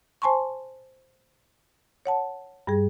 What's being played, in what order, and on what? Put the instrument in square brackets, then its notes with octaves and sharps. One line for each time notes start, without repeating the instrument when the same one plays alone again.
[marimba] C5 G#5 A5 C6 C#6
C#5 F#5 A5
G2 G3 G#4